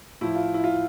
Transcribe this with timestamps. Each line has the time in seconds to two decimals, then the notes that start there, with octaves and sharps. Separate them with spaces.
0.21 A2 F3 E4
0.36 F4
0.54 E4
0.64 F4